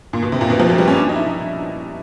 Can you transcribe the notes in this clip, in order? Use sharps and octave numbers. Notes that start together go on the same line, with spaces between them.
A#2
B2
C3
A#2
B2
F3
F#3
G3
C#4
D4
D#4
E4